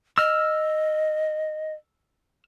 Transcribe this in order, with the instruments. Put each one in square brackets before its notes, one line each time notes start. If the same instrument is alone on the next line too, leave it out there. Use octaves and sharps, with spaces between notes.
[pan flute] D#5 [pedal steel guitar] E6 F6